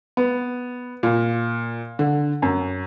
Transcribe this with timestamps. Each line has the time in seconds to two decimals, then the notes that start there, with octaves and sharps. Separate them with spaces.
0.17 B3
1.03 A#2
1.99 D3
2.42 F#2